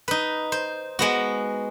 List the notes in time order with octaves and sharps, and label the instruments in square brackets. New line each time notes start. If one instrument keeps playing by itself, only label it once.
[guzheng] D#4 B4
C5
G#3 B3 F#4